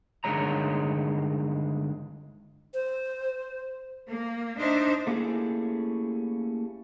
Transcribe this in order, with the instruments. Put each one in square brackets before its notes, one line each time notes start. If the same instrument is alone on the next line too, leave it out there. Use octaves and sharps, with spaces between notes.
[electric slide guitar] G2 D3 D#3 G#3 C#5 A#5
[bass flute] C5
[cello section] A#3
D4 D#4 C5 E5
[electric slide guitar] A3 A#3 C#4 E4 G4 G#4